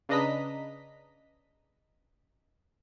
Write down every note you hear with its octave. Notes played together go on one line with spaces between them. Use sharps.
C#3 D4 B4 D#5 A#5 B6